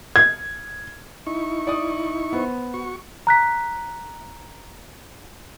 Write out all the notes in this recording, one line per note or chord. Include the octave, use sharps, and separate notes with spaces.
G#6
D#4 E4 C#6
D5 D#6
B3 C5
F#4 C#6
A#5 F#6 B6